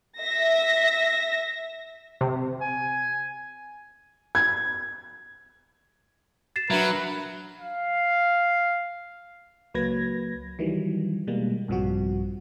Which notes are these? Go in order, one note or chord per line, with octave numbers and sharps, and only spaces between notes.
E5 A#6
C3
G#5
G#6
A6 C7 E7
F#3 D4 A#4 B4 E5
F5
C#2 F#3 A#3 B4 G#6 A#6
D#3 E3 F#3 G3
B2 G3 G#3 A#3
A#1 G2 C3 F3 G3 F#4